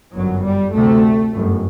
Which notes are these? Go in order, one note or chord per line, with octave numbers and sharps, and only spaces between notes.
G1 F#2 F#3
G3
D2 C3 A3
G1 F#2